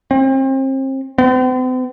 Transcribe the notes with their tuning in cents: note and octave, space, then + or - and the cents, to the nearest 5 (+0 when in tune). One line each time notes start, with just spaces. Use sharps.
C4 +35
C4 -45